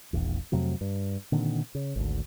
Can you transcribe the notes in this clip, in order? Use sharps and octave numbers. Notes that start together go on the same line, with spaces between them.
E1 A#1 E2
F2 C3 F#3 A3
G2
A#2 D3 D#3 C4
C#3
G#1 D2